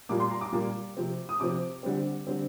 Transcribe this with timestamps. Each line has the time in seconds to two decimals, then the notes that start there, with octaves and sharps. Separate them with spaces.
0.09 A#2 G3 A#3 D6
0.20 C6
0.31 A#5
0.41 D6
0.53 A#2 G3 A#3
0.97 C3 F3 C4
1.29 D#6
1.40 C3 F3 C4 D6
1.83 D3 G3 C4
2.27 D3 G3 C4